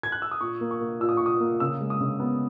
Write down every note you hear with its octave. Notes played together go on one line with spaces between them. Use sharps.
G#6
F#6
E6
D#6
A#2 C#6
A#3
C#6
A#3
A#2 E6
D#6
C#6
A#2
D#6
A#3
C#3 E6
G#3
D#6
C#3
B3